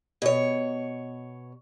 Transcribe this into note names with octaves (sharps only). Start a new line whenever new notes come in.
B2 C#5